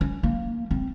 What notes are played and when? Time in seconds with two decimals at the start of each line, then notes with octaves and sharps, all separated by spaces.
0.01 C#4
0.23 A#3
0.71 C4